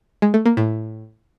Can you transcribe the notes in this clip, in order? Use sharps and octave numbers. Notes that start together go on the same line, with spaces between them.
G#3
A3
A#3
A2